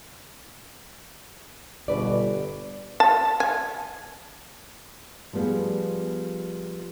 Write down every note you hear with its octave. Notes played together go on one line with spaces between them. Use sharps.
G1 B2 B4 D5
A5
G#5
F3 G3 B3 G#4